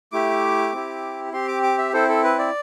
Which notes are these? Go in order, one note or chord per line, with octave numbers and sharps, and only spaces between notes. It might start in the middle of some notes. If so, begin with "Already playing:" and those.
A3 E4 G4 D6
C4 E4 G4
C4 G4 C6
D6
D6
E5
C4 E4 A4 C5
A4
B4
D5